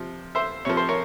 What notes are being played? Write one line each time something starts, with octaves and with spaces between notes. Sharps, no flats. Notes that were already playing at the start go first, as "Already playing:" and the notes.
Already playing: C3 F3
C5 E5
C3 F3 C#5
C5
A#4 C#5